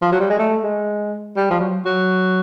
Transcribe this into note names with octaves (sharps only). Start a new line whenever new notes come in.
F3
F#3
G3
G#3
A3
G#3
G3
F3
F#3
F#3